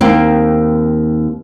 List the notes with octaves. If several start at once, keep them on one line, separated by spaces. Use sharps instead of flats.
D#2 A#3 C4